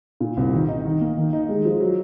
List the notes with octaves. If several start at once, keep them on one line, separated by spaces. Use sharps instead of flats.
A#2
C2
D#3
D#4
D#3
A#3
D#3
D#4
G#3
F3
F#3